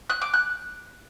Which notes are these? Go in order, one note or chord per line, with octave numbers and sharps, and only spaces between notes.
F#6
D6
F#6